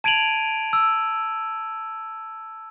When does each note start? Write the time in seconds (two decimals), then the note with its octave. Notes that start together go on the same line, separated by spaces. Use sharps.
0.04 A5 G#6 D7 D#7 F7 F#7
0.73 E6